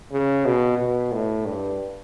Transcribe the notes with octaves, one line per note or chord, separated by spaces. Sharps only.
C#3
B2
B2
A2
G2